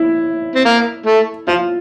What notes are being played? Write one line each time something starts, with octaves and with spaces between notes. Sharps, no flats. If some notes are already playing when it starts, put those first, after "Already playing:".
Already playing: E4
C4
A#3
A3
F3 F4